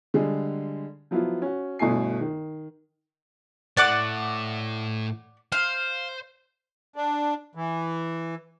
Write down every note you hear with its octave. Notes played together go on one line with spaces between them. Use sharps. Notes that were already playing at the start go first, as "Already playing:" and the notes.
D3 G3 G#3 G#4
F3 F#3 B3 E4 F4
C#4 F#4
G1 B2 A3 E4 G#5 C7
D#3
A2 D5 F#5 D6
C5 F5
D4
E3